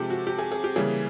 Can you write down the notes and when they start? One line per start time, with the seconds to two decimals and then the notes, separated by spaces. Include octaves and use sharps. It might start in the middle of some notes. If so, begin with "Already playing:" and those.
Already playing: C3 F3 G#3 G4 A4
0.10 F#4
0.27 G4
0.39 G#4
0.52 G#4
0.64 G4
0.76 C#3 E3 G3 A#3 G#4